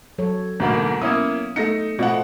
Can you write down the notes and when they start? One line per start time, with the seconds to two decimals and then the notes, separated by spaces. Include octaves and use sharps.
0.18 F#3 A4 C#5
0.60 D2 G#2 B2 A#3
1.01 A#3 B3 C#4 E4 D#6
1.56 A3 D#4 A#6 C#7
1.99 B2 A3 C4 F4 D5 D#5 F#5